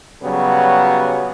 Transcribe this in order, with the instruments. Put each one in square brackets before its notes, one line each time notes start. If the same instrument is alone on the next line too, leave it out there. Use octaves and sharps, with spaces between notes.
[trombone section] C#3 F#3 G3 B3